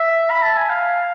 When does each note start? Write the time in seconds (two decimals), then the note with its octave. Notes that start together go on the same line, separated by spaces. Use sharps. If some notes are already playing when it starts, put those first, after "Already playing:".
Already playing: E5
0.30 B5
0.43 A5
0.57 G#5
0.70 F5